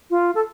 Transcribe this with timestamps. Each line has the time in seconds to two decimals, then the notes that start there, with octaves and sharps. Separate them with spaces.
0.10 F4
0.35 A4